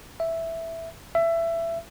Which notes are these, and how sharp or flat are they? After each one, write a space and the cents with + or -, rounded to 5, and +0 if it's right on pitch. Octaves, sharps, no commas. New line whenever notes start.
E5 +0
E5 +20